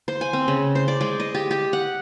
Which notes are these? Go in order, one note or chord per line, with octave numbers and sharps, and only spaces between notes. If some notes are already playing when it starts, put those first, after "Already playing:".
C5
G#5
C4
C#3
C5
D5
G#3
D#5
G4
G4
F#5